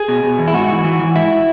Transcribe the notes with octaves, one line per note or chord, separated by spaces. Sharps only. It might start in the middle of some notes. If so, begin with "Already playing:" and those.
Already playing: G#4
B2
B2
E2
E4
G#2 F#4
E3
E3
E3
G#2 E4